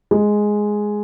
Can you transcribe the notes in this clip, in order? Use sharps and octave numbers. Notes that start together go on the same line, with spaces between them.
G#3